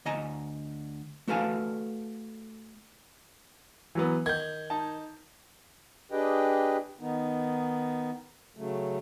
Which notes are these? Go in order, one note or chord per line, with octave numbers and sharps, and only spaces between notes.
D2 D#5 G#5 A#5
A3 F#4 A4 B4 F5 G#5
E3 F#3 B3
D#3 G6 G#6
D#4 A5
D4 G4 G#4 B4 D#5 G5
D#3 B3 D#4
C#3 F#3 A3